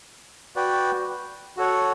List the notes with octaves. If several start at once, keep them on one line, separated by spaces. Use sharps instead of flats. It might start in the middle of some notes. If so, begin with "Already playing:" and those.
F#4 B4 D5 G5
F#4 A4 C#5 F#5